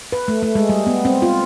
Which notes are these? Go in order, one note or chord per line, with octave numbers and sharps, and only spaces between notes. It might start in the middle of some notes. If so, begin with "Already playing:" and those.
B4
A3
A3
G#3
G3
B3
C4
F4